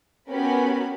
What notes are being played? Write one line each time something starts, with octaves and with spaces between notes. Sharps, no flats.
B3 C#4 F#4 G4 A#4 B5